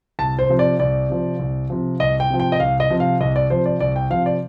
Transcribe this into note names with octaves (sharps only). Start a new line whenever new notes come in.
C2 A5
C5
C3 F3
D5
C2 D5
C3 F3
C2
C3 F3
C2 D#5
G5
C3 F3
G5
D#5
C2 F5
D#5
C3 F3
F5
C2 D#5
D5
C3 F3 C5
D5
C2 D5
G5
C3 F3 F5
D5